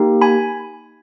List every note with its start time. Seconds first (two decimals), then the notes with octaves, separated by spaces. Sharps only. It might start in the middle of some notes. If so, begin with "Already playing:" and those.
Already playing: A#3 D#4 G4
0.21 G#5 B5